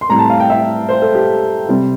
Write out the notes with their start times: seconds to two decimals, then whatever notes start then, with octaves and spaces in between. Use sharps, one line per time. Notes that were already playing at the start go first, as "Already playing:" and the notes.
0.01 C6
0.09 A2 G3 C4 A#5
0.19 A5
0.30 F5
0.40 G5
0.50 E5
0.89 C5
1.02 A4
1.15 G4
1.69 C3 G3 C4